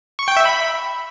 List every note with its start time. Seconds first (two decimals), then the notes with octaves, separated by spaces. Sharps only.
0.19 C#6
0.28 G5
0.37 E5
0.45 B5